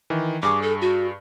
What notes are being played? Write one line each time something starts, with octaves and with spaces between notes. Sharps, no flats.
D#3 E3
G2 G#4 C#6 D6
A4
F#4